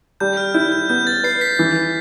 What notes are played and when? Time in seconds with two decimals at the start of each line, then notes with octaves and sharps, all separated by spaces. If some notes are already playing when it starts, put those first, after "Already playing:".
0.20 G3 G6
0.37 F6
0.54 E4 G6
0.72 G6
0.89 B3 G6
1.07 A6
1.24 B4 C7
1.41 B6
1.59 E3